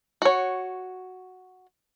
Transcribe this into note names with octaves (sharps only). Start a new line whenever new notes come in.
F#4 C#5